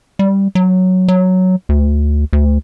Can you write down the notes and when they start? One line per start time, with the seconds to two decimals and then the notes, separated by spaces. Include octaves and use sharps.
0.19 G3
0.55 F#3
1.08 F#3
1.69 D2
2.33 D2